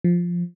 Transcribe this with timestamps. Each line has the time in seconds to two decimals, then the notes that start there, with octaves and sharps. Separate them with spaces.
0.04 F3